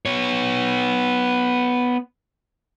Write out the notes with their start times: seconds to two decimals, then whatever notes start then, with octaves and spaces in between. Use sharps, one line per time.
0.06 B3 C#5